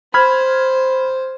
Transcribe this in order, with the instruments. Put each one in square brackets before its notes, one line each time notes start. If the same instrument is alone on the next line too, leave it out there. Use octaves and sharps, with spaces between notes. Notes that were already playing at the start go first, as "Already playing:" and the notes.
[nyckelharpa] C5 [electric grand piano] B5 F6 G#6